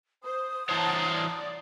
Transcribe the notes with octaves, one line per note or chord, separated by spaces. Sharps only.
C5 D#6
E3 C5 C#5 F#5 A5 A#5
D5